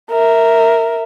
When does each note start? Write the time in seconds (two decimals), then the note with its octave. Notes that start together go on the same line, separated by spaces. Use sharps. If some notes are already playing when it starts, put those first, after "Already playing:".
0.11 A#4 E5